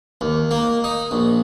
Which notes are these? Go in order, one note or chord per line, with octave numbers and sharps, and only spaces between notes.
D#2
A#3
D#4
A#1